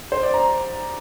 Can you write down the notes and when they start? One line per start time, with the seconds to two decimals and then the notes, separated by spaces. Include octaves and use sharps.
0.12 C5
0.23 D5
0.34 A#5